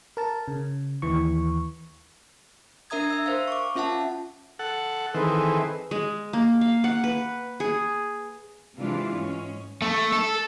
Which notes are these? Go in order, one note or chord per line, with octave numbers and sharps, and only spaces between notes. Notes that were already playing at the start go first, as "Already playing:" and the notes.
A#4 A5
C#3
D#2 E3 C#6
D4 A#4 E5 A#5 D#6 G#6
E5 E6
A#4 C5 F5
C#6 D6
C#4 F4 E5 F#5 A5
A4 F#5
D#3 E3 C4 G#4 A4 B4
G#3
A#3
F5
F#5
B4
G#4
C3 E3 G#3 D4 E4 F4
G#2 G#3 C#4
A3
A4